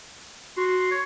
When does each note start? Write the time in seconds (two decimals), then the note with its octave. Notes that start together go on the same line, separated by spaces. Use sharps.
0.57 F#4 C6
0.91 C#5